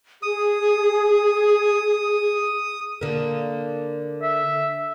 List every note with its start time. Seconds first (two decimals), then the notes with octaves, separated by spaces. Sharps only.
0.22 G#4 D#6
3.01 D3 A#3
4.22 E5